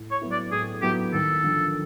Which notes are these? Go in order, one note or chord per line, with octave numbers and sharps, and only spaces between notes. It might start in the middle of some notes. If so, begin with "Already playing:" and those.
Already playing: A2
C#5
F#3 B3 E4
D5
A2 G#4
F#3 B3 E4 G4
D#2 A4
D3 F3